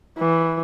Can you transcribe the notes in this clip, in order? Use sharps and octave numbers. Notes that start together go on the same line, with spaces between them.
E3